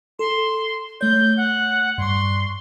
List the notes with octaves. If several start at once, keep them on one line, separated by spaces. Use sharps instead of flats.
A4 C6
A3 C#5 G6
F#5
G2 C6 C#6